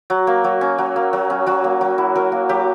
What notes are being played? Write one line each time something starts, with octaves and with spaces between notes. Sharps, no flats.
F#3
A#3
F#3
C#4
F#3
A#3
F#3
C#4
F#3 F#4
A#3
F#3
E4
F#3 A#4
A#3
F#3 G4